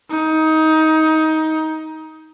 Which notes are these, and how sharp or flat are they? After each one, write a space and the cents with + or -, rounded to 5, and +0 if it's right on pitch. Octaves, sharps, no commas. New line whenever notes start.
D#4 +20